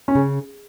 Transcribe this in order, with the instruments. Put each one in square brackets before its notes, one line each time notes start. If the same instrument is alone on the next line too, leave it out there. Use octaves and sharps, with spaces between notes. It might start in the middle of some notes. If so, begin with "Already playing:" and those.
[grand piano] C#4
[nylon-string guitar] C#3